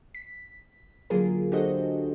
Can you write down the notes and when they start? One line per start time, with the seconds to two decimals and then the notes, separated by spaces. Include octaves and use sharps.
0.15 B6
1.10 D3 F#3 A#3 F4 G#4 A#4
1.52 D4 F#4 G4 A4 C5 D#5